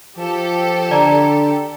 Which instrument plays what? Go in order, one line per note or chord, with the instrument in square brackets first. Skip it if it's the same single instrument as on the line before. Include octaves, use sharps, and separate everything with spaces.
[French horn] F3 [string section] G4 A4
[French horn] D3 [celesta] D5 A#5